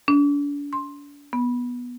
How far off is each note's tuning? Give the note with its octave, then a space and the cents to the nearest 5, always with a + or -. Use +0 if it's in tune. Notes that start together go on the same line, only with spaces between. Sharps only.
D4 -35
C6 +10
B3 -15